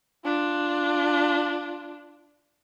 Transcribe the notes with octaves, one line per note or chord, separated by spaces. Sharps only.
D4 F4